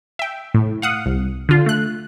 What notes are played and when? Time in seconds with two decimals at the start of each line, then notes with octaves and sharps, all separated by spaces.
0.19 E5 G5
0.54 A2
0.82 F5 F#5 D#6
1.06 C2
1.49 D3 F4
1.66 A3 F#6